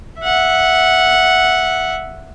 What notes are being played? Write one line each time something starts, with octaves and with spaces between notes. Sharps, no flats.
E5 F#5